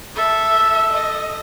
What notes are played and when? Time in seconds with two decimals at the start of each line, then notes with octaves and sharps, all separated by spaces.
0.16 A4 E5
0.93 D#5